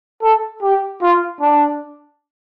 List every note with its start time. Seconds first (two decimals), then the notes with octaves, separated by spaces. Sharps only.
0.22 A4
0.62 G4
1.01 F4
1.40 D4